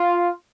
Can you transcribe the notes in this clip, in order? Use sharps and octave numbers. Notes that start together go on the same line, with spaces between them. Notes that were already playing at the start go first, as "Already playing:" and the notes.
Already playing: F4